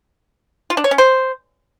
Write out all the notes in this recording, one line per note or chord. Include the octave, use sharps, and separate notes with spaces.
F4
D4
C#5
C#4
C5